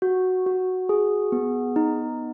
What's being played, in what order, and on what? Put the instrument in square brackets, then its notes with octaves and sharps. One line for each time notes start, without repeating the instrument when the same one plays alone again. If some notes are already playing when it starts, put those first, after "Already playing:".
[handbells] F#4
F#4
G#4
B3
D#4